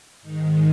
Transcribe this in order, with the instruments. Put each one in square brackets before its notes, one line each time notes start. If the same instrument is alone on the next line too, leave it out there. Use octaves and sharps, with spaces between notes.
[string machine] G#2 D#3 G#3 D#4